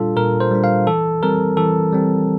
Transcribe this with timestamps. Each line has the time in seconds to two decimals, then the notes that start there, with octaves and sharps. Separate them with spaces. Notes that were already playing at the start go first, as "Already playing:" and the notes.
Already playing: A#2 G3 D4 F4 A4
0.17 A#2 A#4
0.40 C5
0.51 G3 D4
0.64 F5
0.87 E3 A4
1.23 G3 C4 A#4
1.57 E3 A4
1.93 G3 C4